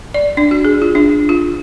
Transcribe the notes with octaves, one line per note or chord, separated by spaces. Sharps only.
D5
D4
F#4
G#4
F4
D4
F4